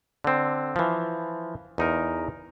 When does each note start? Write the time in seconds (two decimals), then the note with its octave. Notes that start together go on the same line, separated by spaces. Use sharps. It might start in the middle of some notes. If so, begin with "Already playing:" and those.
0.24 D3 C4
0.76 E3 F3
1.78 E2 D#4 A#4